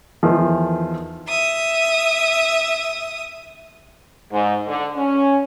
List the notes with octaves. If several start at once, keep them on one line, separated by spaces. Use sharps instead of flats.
E2 D#3 F3
E5 D#6
G#2
D3
C#4